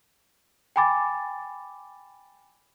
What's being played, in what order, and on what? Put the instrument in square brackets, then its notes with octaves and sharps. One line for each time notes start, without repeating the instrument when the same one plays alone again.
[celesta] G5 G#5 B5 D6 A6